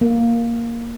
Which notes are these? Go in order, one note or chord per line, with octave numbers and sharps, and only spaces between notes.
A#3